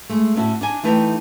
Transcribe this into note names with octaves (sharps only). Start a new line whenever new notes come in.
G#3 A3
A2 C#4 E4 F#4
D4 D#4 G#5
E3 A3 D#4 B4 F5 G5